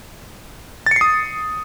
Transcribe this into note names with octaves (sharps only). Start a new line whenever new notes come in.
D#6 A6 C7 C#7